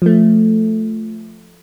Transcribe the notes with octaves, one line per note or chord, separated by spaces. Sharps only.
F3 A3